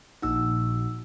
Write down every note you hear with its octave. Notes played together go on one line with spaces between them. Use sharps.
A#1 D#4 F#4 E6